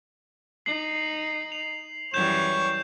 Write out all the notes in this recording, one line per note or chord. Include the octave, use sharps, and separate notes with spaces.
D#4 C7 F#7
F7
F#2 E3 G3 C#5 G6 E7